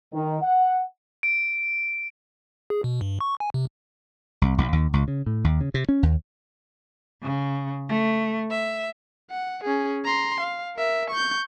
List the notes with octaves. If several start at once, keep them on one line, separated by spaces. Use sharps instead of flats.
D#3
F#5
D7
G#4
B2
G2
C#6
G#5
C3
C2
B1
D#2
C#2
C#3
A2
D#2
C#3
C3
C#4
D#2
C#3
A3
E5
F#5
C#4 G#4
A#5 C6
F5
A#4 E5
C#6 G6